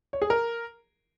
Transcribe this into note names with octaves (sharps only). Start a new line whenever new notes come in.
C#5
G#4
A#4